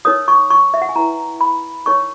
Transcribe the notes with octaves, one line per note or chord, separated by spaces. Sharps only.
D#4 A#4 C#5 D#6
C#6
C#6
E5
F#5
G#5
E4 B4 A#5
B5
D#4 A#4 C#5 C#6